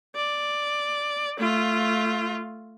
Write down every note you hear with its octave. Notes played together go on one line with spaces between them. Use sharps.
D5
A3 F4